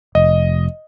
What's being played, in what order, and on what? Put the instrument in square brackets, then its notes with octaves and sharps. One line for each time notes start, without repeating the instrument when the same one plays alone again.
[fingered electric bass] F1 [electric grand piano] D#5